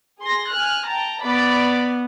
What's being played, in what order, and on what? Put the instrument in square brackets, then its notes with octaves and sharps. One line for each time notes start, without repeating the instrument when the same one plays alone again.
[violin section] G#4 C6 A#6
G#5 F6 F#6
G5 A5 A#5
[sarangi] B3 [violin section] D5 B5 D6